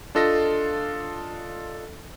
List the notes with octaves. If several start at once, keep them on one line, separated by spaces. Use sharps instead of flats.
D4 F4 A4 D#5 A#6